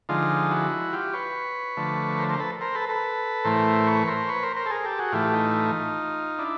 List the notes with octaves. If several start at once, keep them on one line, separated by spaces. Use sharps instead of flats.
D3 F3 G#3 D#4 F4
E4 F#4
F4 G4
B4 C#5
D3 F3 A3
A#4 C5
A#4 C5
A4 B4
A#4 C5
A4 B4
A4 B4
A2 E3 A3 A#4 C5
B4 C#5
A#4 C5
B4 C#5
A#4 C5
A#4 C5
A4
G#4 A#4
G4 A4
F#4 G#4
A2 E3 A3 F4 G4
D#4 F4
D4 E4